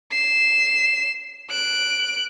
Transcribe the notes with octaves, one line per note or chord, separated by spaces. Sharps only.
C7 E7
F#6 D7